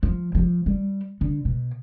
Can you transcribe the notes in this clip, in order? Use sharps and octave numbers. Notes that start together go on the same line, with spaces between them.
F3
F3
G3
D3
B2